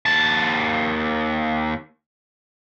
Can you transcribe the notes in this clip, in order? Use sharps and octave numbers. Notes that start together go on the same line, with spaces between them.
D#2 A5